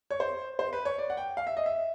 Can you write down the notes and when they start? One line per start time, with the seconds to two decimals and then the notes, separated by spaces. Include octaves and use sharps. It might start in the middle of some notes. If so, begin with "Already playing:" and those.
0.11 C#5
0.20 C5
0.59 C5
0.73 B4
0.85 C#5
0.98 D5
1.10 F#5
1.17 G5
1.37 F5
1.47 E5
1.57 D#5
1.66 E5